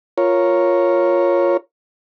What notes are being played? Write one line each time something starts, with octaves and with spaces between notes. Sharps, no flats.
F4 A#4 C#5